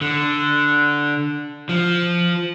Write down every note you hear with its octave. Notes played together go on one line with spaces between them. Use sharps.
D3
F3